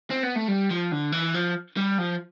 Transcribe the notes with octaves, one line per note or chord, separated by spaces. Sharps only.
C4
B3
A3
G3
F3
D3
E3
F3
G3
F3